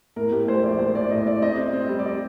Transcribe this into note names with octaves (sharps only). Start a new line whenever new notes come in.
A2 A#4
A2 G4
A3 C5
A#1 D5
A3 C5
A2 D5
A2 D#5
A3 D5
C4 D#5
C4
C4
G3
D5
D#5